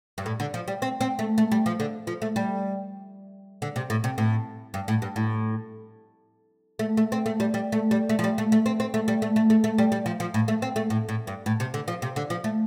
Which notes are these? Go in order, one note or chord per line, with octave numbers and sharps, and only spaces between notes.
G2
A2
D3
F3
G3
C4
C4
A3
A3
G3
F3
D3
F3
A3
G3
D3
C3
A2
C3
A2
G2
A2
G2
A2
A3
A3
C4
A3
G3
G3
A3
G3
A3
F3
G3
A3
A3
C4
C4
A3
G3
A3
A3
A3
A3
G3
G3
F3
F3
A2
A3
C4
A3
A2
A2
G2
A2
C3
D3
F3
C3
D3
F3
A3